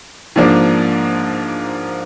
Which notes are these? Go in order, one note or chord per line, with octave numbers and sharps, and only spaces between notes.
G#2 F3 A#3 D4